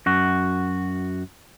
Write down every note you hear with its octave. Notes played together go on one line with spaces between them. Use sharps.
F#2 F#4